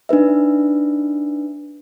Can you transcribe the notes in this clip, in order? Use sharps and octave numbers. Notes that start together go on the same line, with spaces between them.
D4 D#4 B4 E5